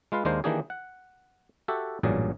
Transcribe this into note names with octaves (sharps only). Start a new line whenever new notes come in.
G#3 F4 B4 F5
D#2 G#3 D4 A#4 C5 F5
D#3 E3 A#3 D4 G4 G#4
F#5
F#4 G4 A4 E5 F#5
A1 G2 A#2 F#3 G#4 D5